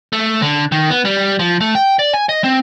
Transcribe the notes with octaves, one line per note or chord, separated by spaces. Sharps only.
A3
D3
D#3
B3
G3
F3
A3
G5
D5
G#5
D#5
C4